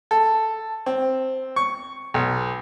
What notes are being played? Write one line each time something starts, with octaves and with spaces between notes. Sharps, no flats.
A4
C4
C#6
B1